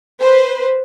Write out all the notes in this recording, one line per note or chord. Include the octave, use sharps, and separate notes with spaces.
B4 C5